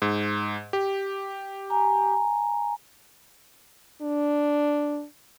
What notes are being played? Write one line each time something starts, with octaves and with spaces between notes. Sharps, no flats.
G#2
G4
G#5 A#5
D4